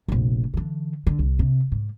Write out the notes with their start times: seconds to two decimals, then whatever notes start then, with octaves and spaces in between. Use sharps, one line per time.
0.08 F1 A#1
0.54 D3 E3
1.07 D3
1.19 C2
1.39 C3
1.72 G#2